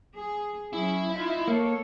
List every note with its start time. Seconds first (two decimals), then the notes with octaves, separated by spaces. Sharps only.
0.17 G#4
0.73 F#3 C#4 E4 G#4
1.12 D#4 F4 E5
1.48 A#3 A4 C#5